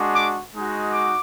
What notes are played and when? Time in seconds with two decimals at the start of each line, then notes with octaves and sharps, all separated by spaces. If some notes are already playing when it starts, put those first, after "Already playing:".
Already playing: G#3 D4 F#4
0.15 D6
0.54 G#3 D#4 F#4
0.93 D6